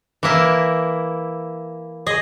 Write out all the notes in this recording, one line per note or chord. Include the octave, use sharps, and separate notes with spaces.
E3 A#3 E4
G#4 D#5